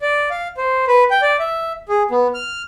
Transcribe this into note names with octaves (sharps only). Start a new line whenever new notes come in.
D5
F5
C5
B4
G5
D5
E5
G#4
B3
F6